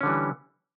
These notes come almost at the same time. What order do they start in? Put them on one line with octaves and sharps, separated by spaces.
C#4 D3 G3 E3